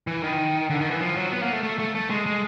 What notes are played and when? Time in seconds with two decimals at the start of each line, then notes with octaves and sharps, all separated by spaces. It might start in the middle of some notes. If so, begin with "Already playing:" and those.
0.07 E3
0.23 D#3
0.70 D3
0.81 D#3
0.90 E3
1.01 F3
1.17 F#3
1.32 B3
1.42 A#3
1.53 A3
1.63 A3
1.79 A3
1.95 A3
2.10 G#3
2.26 G#3